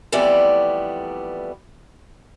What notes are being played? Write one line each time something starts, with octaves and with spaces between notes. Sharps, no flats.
F2 E3 G3 A3 B3 D5